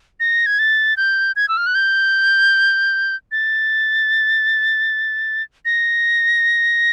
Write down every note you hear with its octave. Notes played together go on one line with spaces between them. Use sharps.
A#6
G#6
A6
G6
G#6
E6
F6
F#6
G6
A6
A#6